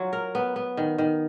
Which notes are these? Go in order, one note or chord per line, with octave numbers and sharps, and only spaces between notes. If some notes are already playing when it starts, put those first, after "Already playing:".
Already playing: F#3 F4
A#4
B3
B3
D#3
D#3